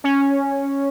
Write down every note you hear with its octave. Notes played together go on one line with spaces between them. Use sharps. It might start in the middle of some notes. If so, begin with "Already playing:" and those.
C#4